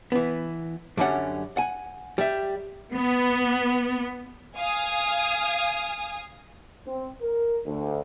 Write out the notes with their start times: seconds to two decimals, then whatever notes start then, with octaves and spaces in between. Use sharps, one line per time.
0.12 E3 B3
0.97 F#2 D3 G3 C#4 F#5
1.57 F#5 G#5
2.18 G3 E5
2.94 B3
4.57 F5 G#5 D#6
6.87 C4
7.21 A#4
7.65 D2